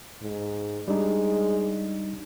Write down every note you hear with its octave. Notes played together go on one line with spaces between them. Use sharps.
G#2
G3 G#3 D4 D#4